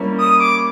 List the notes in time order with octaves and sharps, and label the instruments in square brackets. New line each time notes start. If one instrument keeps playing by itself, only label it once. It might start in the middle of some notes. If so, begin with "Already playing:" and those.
Already playing: [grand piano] G3 A#3 C#4 E4
[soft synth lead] D#6
D6